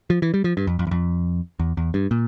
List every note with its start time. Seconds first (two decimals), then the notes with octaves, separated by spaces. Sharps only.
0.10 F3
0.22 E3
0.34 G3
0.44 F3
0.57 G2
0.67 F2
0.79 F2
0.87 E2
0.91 F2
1.60 E2
1.77 E2
1.94 G2
2.11 A#2